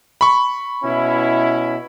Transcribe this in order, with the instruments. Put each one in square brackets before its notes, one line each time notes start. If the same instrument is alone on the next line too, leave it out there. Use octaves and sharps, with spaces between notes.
[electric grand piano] B5 C#6
[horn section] B2 C#4 E4